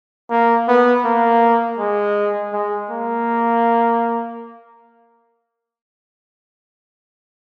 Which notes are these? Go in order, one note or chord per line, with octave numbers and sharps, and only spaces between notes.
A#3
B3
A#3
G#3
G#3
A#3